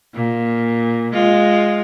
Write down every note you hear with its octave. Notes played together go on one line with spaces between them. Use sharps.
A#2
G#3 F4